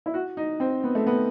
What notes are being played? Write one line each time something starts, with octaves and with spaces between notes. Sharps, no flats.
E4
F#4
D#4
C4
B3
A3
B3